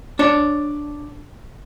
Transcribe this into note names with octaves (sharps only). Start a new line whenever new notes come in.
D4 C#5